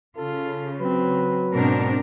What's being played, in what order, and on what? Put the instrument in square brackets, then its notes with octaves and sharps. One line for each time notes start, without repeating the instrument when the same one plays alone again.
[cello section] C#3 [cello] F4 [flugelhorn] A4
[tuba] F#3 [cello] C4 [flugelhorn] B4
[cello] G#2 B2 [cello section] C4 D4 A#4